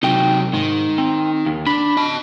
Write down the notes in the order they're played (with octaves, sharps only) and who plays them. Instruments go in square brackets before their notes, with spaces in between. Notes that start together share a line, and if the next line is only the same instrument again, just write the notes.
[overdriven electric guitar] C3 F#3 [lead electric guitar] D#4 G5
[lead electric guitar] G#2 [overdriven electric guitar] D#3
[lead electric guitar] C4
D#2
[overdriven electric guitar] D4 [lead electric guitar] B5
[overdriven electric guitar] D#5 A5